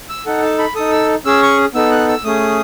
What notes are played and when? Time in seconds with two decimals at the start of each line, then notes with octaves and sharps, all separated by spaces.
0.09 E6
0.26 D#4 A4 F#5
0.43 A5
0.59 B5
0.75 D#4 A4 D#6
0.92 E6
1.25 C#4 G#4 E6
1.42 C#6
1.74 B3 D#4 A4 E6
1.91 F#6
2.08 E6
2.24 A3 C#4 G#4 D#6